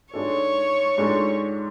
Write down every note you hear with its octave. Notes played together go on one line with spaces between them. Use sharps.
G#2 G#3 D4 A4 C#5
G#2 G#3 D4 A4